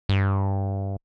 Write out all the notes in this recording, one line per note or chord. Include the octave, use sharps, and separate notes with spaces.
G2